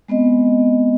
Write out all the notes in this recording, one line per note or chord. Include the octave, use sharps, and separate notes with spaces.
G#3 B3 C4 D#5